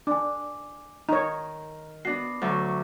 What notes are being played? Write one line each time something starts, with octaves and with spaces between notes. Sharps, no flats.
D4 G#5 D6
D#3 D#4 C#5 A#5
B3 D4 F#4 C7
D2 F#3 A4